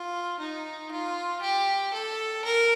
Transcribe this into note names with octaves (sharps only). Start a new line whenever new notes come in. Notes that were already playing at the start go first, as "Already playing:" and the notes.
Already playing: F4
D#4
F4
G4
A4
A#4